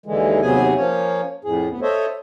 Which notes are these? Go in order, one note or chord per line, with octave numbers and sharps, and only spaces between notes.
D#2 D3 E3 G#3
D#2 C3 F#3 B3 G#4 G#5
F3 A#3 C#4 C#5
F2 A2 G#4
D2 B3
A4 C5 C#5 D#5 E5